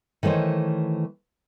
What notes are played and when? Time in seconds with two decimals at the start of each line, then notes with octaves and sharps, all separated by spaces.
0.23 D#3 E3 A3 C5 C#5